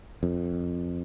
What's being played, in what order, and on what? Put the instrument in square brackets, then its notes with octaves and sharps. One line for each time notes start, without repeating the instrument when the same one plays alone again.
[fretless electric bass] F2